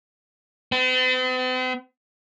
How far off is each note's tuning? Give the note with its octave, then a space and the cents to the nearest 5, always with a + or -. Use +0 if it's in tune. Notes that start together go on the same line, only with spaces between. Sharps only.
C4 -45